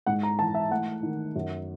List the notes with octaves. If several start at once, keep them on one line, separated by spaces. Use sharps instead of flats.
G#2 F#5
A#5
E3 A5
E5
A3 F#5
D#3
F#2